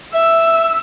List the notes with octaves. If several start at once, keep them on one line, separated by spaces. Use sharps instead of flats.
E5 E6